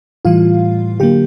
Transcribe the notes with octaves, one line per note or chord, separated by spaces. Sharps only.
A2 E3 G3 F4 F5
D3 F#3 A#3 G4 G5